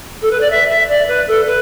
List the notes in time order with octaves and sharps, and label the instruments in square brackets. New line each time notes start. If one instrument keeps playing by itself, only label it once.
[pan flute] A4
B4
D5
E5
E5
D5
B4
A4
B4